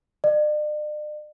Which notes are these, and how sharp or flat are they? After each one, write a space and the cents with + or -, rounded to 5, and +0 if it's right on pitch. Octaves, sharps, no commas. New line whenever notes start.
D5 +40